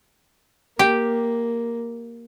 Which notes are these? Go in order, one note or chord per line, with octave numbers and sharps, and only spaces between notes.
A#3 G4